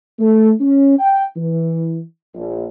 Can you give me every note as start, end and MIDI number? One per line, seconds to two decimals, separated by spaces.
0.20 0.51 57
0.60 0.96 61
0.99 1.24 79
1.36 2.01 52
2.34 2.66 34